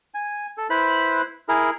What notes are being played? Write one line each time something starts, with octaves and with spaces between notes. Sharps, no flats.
G#5
A4
E4 B4 C5 B5 F#6
E4 G#4 A#4